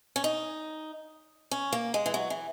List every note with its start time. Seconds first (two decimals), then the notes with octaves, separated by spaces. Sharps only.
0.16 C#4
0.24 D#4
1.51 C#4
1.73 A#3
1.94 G#3
2.06 E3
2.14 F#3
2.30 E3